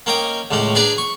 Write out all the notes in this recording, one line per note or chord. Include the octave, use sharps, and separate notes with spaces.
A#3 C#4 D#5 G5
C#2 A2 C#4
D4 G#4 B4 D5 A#5
C#6